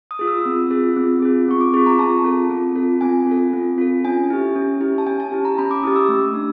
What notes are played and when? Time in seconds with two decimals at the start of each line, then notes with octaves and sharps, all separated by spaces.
0.11 D#6
0.19 F4 G#4
0.28 E6
0.46 C4
0.70 F4 G#4
0.96 C4
1.22 F4 G#4
1.48 C4 C#6
1.61 D6
1.74 F4 G#4 C#6
1.86 A#5
1.99 C4 A5
2.24 F4 A4
2.50 C4
2.76 F4 A4
3.01 C4 G#5
3.27 F4 A4
3.53 C4
3.78 F4 A4
4.05 C#4 G#5
4.30 E4 G4
4.55 C#4
4.81 E4 G4
4.98 A5
5.07 C#4 G#5
5.20 A5
5.32 E4 G4
5.45 A#5
5.58 C#4 B5
5.71 D6
5.83 E4 G4 D#6
5.96 E6
6.09 A3
6.34 D4